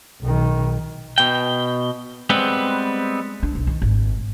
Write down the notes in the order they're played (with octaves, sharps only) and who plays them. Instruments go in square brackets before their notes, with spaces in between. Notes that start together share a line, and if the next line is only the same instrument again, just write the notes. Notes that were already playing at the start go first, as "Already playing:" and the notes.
[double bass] B1 D#3
[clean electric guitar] B2 G5
G3 G#3 B3 C4 B4
[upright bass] D4
B1
D#3
G#1